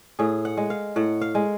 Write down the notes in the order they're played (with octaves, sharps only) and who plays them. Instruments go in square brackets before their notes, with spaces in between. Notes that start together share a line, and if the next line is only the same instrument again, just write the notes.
[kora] A2 G#4
F#5
G#3
F5
A2 F#5
F5
G#3